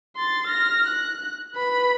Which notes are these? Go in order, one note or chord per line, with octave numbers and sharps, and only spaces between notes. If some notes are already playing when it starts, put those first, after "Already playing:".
C6 A6
F6 A#6
F#6
B4 B5